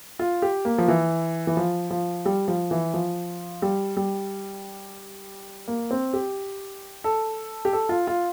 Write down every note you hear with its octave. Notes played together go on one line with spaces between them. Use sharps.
F4
G4
A#3
F3
E3
E3
F3
F3
G3
F3
E3
F3
G3
G3
A#3
C4
G4
A4
G4
A4
F4
F4